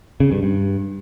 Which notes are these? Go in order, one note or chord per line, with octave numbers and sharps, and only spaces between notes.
C#3
G2
G2